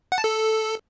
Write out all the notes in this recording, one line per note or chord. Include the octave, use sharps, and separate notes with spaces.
F#5
A5
A4